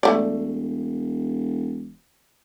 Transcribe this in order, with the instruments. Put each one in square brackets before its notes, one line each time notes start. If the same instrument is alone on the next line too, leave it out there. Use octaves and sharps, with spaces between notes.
[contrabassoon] E1 [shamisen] A3 D5